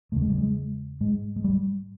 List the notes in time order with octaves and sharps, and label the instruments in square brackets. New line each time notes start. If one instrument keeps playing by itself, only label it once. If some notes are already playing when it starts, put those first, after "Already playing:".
[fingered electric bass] E2 C#3 A3
G#3
G3
G#3
G#2 G#3
G#3
G3